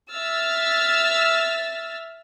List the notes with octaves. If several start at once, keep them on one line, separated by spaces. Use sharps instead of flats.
E5 E6 F6 A6